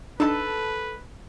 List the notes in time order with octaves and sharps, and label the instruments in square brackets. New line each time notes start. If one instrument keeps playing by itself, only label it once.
[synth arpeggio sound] D4 D#4 [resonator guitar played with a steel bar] A4 A5 [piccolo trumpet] B4